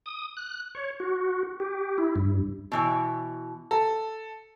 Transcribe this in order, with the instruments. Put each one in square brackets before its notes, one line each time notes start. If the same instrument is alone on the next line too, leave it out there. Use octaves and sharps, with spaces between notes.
[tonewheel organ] D#6
F#6
C#5
F#4
G4
E4
G2
[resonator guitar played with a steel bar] B2 E3 C#5
[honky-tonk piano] A4